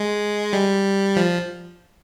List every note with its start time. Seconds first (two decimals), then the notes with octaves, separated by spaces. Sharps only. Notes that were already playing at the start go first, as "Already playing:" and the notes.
Already playing: G#3
0.53 G3
1.16 F3